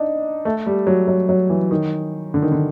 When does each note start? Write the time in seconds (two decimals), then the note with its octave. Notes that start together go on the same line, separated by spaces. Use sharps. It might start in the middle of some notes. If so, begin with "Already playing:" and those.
Already playing: D4 D#4
0.45 A3
0.66 G3
0.87 F#3
1.08 F#3
1.29 F#3
1.49 E3
1.71 D#3
2.34 D3
2.42 D#3
2.52 D3